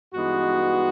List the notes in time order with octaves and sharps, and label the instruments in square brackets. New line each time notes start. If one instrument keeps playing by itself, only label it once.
[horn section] G2 E3 G#3 B3 D#4 F#4